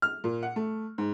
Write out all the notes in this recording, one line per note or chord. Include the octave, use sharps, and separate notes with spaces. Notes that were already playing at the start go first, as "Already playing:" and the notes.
F6
A#2
F#5
A3
G#2